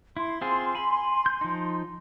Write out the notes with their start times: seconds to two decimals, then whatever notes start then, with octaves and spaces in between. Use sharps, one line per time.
0.17 E4 C6
0.41 C4 F4 G#4
0.75 G#5 B5
1.26 G6
1.41 F3 D#4